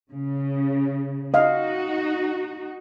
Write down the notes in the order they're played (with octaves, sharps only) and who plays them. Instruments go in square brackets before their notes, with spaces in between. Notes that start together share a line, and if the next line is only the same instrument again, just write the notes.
[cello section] C#3
[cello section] D#4 F#4 [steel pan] D#5 F5